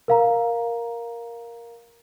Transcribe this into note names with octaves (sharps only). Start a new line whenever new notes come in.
A#4 F5 A#5